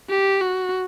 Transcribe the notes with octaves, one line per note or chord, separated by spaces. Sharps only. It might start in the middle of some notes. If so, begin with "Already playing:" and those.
G4
F#4